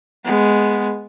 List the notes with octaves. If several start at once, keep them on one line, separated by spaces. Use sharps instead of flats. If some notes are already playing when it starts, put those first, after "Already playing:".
G#3 B3